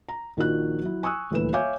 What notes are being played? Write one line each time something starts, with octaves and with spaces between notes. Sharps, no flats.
A#5
A#1 D#3 F3 D#4 F#4 F#6
F#3 E4
G#5 C#6 D#6 E6 F#6
D#1 D2 E3 B4 E7
C#5 E5 F5 G#5 D6 G6